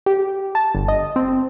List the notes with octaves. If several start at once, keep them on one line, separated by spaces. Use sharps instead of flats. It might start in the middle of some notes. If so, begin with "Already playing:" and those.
G4
A5
G1
D#5
C4